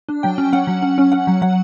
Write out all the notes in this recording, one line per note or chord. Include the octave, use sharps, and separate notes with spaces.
D4
F#3 G5
C#4
C#4 F#5
F#3
C#4
C#4
C#4 F#5
F#3
F#3 F#5